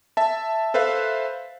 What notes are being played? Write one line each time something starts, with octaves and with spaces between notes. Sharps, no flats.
E5 A5
A4 B4 C5 E5 F5